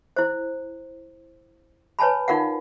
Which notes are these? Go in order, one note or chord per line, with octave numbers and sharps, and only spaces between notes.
E4 C5
B4 C#5 G#5 A5 B5
D#4 F4 A#4 F5 F#5